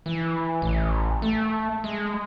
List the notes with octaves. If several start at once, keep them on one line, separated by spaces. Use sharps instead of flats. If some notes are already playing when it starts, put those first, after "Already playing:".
E3
A1
A3
G#3